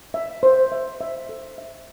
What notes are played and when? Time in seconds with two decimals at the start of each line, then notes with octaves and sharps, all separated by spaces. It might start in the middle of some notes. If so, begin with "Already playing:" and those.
0.14 E5
0.43 C5
0.72 E5
1.01 E5
1.29 A4
1.58 E5